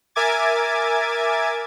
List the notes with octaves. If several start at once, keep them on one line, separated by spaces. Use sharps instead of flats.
A#4 E5 G#5 D6 G#6 A6